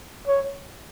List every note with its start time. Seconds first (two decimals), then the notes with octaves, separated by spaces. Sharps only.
0.27 C#5